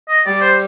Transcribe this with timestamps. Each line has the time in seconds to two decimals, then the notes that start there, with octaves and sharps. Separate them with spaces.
0.09 D#5
0.26 G3 D5
0.41 C5